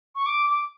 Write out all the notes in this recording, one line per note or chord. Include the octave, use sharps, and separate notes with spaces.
C#6
D6
D6